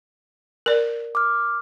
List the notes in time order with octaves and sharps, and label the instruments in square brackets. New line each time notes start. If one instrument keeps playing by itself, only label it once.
[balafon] A#4 D5
[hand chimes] D6 F6